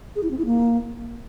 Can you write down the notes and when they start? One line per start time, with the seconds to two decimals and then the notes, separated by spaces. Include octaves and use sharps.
0.16 G#4
0.23 E4
0.31 C4
0.38 E4
0.46 A#3